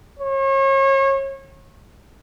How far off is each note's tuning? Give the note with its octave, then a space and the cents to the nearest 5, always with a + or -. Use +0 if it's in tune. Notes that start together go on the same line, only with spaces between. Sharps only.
C#5 -35